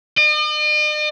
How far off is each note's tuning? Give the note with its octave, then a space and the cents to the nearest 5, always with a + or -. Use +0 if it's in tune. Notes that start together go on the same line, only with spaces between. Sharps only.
D#5 -45